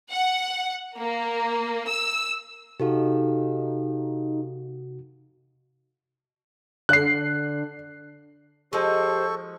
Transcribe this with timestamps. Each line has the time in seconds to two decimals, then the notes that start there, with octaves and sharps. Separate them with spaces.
0.11 F#5
0.98 A#3
1.89 E6
2.80 C3 D#4 F#4 G4 A4 F5
6.89 D3 F#6 C7
8.73 F3 G#3 G4 A4 C5 C#6